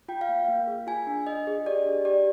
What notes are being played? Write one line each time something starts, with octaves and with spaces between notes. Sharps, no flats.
F4 G5
F5
A#3
A#3
G#4
F4 G#5
D4
D4 D#5
G#4
G4 D5
D4
G4 D5